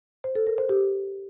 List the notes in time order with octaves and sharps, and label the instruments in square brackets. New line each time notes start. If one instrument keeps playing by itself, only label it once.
[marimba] C5
A4
A#4
C5
G4